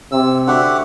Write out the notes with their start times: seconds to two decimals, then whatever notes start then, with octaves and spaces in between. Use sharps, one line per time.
0.12 C3 E6
0.47 D3 F#4 G4 E5 F#5